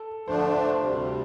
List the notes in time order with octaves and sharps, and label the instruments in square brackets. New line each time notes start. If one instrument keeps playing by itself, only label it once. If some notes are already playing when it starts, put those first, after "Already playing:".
Already playing: [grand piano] A4
[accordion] D3 F3 A3 D4 [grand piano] C5
[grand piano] C5
[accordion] D2 C3 G3